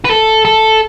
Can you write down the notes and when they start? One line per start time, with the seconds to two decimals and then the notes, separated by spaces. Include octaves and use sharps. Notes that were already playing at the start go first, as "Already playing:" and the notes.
0.05 B4
0.10 A4
0.45 A4